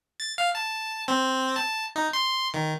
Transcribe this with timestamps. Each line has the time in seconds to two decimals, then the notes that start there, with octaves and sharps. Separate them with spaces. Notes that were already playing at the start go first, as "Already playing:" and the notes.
0.20 A6
0.38 F5
0.55 A5
1.08 C4
1.56 A5
1.96 D#4
2.13 C6
2.54 D#3